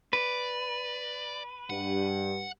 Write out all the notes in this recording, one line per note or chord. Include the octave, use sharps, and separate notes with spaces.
B4 D5
G2 F#5